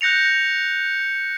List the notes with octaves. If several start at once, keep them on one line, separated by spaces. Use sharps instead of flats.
F#6 G6 A#6 C#7 F7